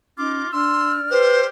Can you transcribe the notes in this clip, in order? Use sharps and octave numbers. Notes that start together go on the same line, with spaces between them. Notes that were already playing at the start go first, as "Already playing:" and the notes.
C#4 D#4 F4 D6
D4 D5 C6 E6 F6
G4 B4 C5